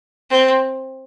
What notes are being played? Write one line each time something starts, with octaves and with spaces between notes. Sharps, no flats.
C4